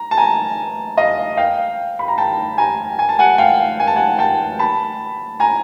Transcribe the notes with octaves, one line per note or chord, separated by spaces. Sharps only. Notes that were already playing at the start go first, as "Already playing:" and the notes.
Already playing: A#5
A5
G#5 A#5
D#5 F5
F5 G5
B5
A#5
G5 A5
G#5 A#5
G#5
A5
F#5 G#5
F5 G5
G#5
A5
F#5 G#5
G5 A5
A5 B5
G#5 A#5